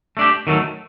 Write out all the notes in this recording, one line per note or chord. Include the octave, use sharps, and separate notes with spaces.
A3 D4 G4
D#3 F#3 A3